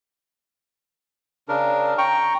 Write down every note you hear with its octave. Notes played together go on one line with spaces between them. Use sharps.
C#3 D4 A#4
G5 A#5 C#6